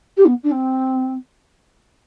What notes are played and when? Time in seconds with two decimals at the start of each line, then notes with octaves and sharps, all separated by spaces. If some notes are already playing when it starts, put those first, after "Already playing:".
0.17 G4
0.26 B3
0.44 D4
0.52 C4